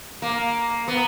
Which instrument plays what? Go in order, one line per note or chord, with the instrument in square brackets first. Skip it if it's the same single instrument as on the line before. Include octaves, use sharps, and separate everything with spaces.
[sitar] A#3
B3